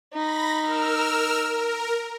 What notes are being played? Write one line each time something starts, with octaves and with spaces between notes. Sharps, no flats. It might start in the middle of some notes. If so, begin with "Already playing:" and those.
D#4 B5 A#6
A#4 E6 F6
A#4